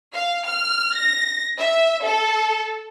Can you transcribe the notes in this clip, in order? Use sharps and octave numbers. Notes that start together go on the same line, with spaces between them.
F5
F6
A#6
E5
A4